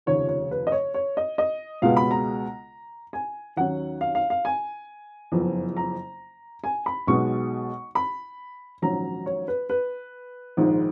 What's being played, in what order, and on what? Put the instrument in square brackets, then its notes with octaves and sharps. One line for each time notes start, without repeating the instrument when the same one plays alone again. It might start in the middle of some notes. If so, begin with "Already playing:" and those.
[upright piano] F1 D#2 C#3 F3 C#5
C#5
B4
D#5
C#5
C#5
D#5
D#5
C#2 B2 G#3 B3 F5
B5
A#5
G#5
D#2 D#3 F#3 C#4 F#5
F5
F5
F5
G#5
F#1 F2 F3 B3
A#5
G#5
B5
B1 B2 G#3 B3 C#6
B5
A#1 G#2 D#3 F#3 C#4 A#5
C#5
B4
B4
A#1 G#2 D#3 G#3